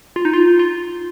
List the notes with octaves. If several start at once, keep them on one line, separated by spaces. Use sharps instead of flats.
F4
D#4
F4
F4